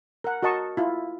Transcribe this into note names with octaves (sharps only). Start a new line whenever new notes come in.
A#4 F#5
F#4 A#4 D#5 A5 C#6
E4 F4